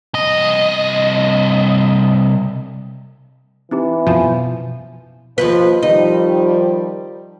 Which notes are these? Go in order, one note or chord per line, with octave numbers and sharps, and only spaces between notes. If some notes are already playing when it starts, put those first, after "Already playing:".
C2 D#5
E3 C4 D#4 G4
F#2 B2 F3 C5 G#5 A5
D#2 G#2 F3 B4
D#3 F3 G3 D#4